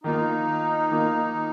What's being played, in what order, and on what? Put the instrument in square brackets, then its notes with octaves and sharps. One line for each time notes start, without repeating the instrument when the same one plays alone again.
[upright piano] D#3 A#3 F4 [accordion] D#4
[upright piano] D#3 A#3 F4